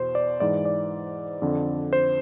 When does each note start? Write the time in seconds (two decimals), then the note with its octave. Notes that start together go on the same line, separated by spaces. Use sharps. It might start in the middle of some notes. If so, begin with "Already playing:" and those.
Already playing: E2 B2 C5
0.15 D5
0.40 G#2 E3 D5
0.65 D5
1.42 F2 D3
1.93 C5